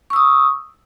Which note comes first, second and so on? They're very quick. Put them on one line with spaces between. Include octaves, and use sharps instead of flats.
C#6 E6 D#6